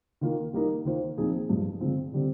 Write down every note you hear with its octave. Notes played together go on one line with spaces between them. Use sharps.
D#3 A#3 F4 A#4
G3 A#3 D#4 A#4
D#3 A#3 F4 C5
A#2 F3 C4 D#4 G#4
G2 F3 G#3
D3 G#3 C4 F4
D3 G3 C4 G4